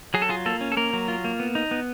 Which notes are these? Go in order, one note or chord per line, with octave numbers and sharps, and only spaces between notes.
F#3 G#4
A4
F4 G#4
A#3 A4
C#4
A4
A#3 A#4
F#3
F4
A#3
B3
D#4
B3